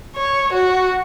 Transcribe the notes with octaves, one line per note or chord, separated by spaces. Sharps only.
C#5
F#4